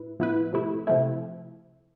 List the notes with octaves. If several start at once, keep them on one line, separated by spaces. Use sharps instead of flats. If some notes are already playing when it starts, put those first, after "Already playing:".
Already playing: A2 E4 B4
A2 F3 B3 E4 B4
C3 F3 A3 E4
C3 F3 A3 E4